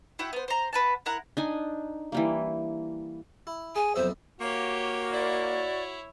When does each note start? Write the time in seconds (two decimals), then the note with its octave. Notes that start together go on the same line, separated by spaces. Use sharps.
0.19 E4 F#4 F#5 G5
0.33 B3 C5
0.48 C5 A#5
0.73 B4 F#5 A5
1.06 E4 A#4 F#5 A#5
1.37 D4 D#4 G#5
2.12 E3 G3 A#3
3.47 E4
3.76 G#4 G#5
3.96 B1 F2 C5 E5
4.40 A#3 F#4 G4 C#5
5.12 E4 C#5 D5